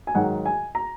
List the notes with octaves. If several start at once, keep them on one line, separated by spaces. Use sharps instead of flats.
G#5
G#2 D#3 F#3 F#5
G#5
A#5